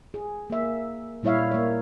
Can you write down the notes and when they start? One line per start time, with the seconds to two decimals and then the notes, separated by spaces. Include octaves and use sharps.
0.14 G#4
0.50 A#3 E5
1.23 A#2 G3 E4 C#5 E5 F5
1.51 A#3 C#5